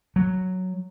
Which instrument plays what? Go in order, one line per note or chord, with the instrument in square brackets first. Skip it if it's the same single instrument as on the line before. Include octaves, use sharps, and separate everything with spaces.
[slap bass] F#3